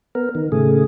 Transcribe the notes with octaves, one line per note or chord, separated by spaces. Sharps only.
B3 A#4
D#3
A2 C#3 A3 G#4